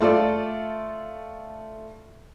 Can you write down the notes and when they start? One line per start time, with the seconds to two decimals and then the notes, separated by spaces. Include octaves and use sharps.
0.01 A3 F4 A4 D5